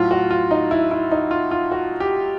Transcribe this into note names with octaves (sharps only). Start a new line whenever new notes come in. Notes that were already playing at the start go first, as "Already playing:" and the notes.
Already playing: A2 F#3 F4
F#4
F4
D#4
E4
E4
D#4
F4
F4
F#4
G4